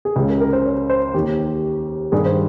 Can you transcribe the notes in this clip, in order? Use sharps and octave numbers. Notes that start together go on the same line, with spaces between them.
G#4
C#2 C#3 G4
A#4
A#4
C5
C#5
C5
D#2 D#3 G4
G2 D#3 G#4
C5